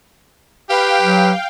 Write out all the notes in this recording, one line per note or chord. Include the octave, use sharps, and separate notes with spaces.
G4 B4 F5 G5
F#3